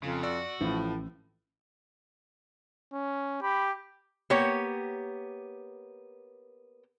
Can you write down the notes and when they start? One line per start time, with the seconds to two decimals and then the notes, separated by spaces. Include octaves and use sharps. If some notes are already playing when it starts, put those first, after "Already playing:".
0.03 F2 C#3
0.23 F#4 D5 E6
0.61 A1 A2 F3
2.93 C#4
3.43 G4 B5
4.30 A#3 B3 G4 C#5